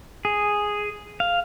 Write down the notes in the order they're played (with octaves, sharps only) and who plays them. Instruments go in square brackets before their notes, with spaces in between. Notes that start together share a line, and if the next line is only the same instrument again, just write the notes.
[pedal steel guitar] G#4
F5